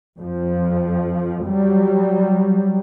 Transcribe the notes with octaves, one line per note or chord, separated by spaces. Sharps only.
F2 F3
F#3 G3